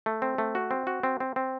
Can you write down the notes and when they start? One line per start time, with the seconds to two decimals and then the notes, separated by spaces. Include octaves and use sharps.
0.06 A3
0.22 C4
0.38 A3
0.55 F#4
0.71 C4
0.87 F#4
1.03 C4
1.20 C4
1.36 C4